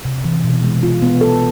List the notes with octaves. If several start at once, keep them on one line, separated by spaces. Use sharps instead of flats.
C3
E3
B2
G#3
F4
B3
A4